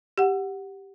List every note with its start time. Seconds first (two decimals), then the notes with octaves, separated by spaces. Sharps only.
0.18 G4 F#5